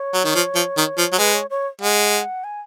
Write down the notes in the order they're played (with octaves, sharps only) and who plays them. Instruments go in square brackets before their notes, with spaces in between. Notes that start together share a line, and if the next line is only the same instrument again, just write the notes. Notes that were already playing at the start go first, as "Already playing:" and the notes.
Already playing: [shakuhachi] C#5
[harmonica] F#3
D#3
F3
F3
D#3
F3
F#3
[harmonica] G#3 [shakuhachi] B4
[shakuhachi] C#5
C#5
[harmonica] G#3 [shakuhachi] F#5
[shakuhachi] G#5